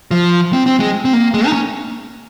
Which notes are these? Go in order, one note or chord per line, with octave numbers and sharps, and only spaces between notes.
F3
C4
C4
G#3
C4
A#3
G#3
D#4
C#4